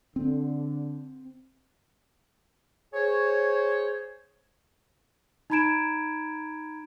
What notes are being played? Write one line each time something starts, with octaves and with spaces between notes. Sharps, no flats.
D3 C4
G#4 C5 C#5
D#4 A#5 B5 G#6 D7 E7